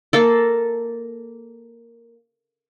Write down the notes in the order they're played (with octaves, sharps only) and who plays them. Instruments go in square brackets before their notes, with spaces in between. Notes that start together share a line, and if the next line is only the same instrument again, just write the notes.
[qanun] A#3 A4